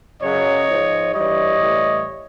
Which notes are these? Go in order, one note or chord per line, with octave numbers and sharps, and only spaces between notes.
F#2 C#3 F#3 C#5 D#5
G#2 F3
G2 E3 G3 C#5 D#5
A2 E3 G3